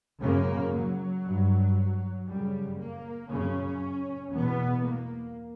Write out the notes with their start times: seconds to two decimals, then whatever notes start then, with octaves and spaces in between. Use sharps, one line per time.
0.21 F#2 C#3 A#3
0.73 F#3
1.24 G2
2.27 F#2 C#3 G3
2.79 A#3
3.31 F#2 C#3 C#4
4.33 E2 B2 B3
4.85 A#3